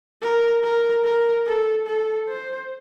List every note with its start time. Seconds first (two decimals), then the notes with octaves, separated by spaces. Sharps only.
0.22 A#4
0.63 A#4
1.04 A#4
1.46 A4
1.87 A4
2.28 C5